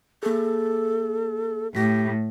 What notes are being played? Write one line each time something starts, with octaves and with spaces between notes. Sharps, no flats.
A#3 G#4 A4
A2 G4 A#6 B6